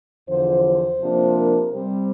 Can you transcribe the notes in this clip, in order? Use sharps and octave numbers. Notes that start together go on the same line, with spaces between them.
E2 D3 F3 C5
C5
C3 F3 A#3 D4
A#4
C3 G3 C4 C5